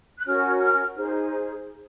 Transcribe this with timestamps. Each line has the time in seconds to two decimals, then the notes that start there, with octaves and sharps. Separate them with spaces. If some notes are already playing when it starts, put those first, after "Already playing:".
0.18 F#6
0.25 C#4 F#4 A#4 C#5 F6
0.62 F6
0.96 D#4 G#4 C5